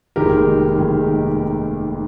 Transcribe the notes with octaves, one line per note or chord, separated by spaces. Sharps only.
F1 D#2 D#3 G#3 G4 A#4
F1 D#2 D#3 G#3